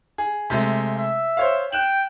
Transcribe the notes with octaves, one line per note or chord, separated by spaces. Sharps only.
G#4
C3 G#3 A3
E5
C5 C#5 F5
G5 F#6 E7 F#7